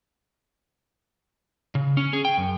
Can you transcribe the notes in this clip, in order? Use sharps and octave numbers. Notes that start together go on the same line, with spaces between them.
C#3
C#4
G#4
G5
F#2